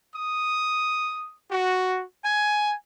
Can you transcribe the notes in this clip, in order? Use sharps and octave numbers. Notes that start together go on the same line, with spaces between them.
D#6
F#4
G#5